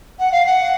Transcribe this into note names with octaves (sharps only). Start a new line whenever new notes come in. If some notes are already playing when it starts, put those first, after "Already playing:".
F#5
F5
F#5